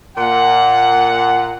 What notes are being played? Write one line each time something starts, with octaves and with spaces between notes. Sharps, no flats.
A#2 F#5